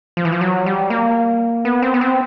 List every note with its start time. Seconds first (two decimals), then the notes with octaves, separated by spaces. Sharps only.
0.17 F3
0.25 E3
0.32 F3
0.41 F#3
0.66 G3
0.90 A#3
1.65 B3
1.82 C4
1.94 B3
2.01 C4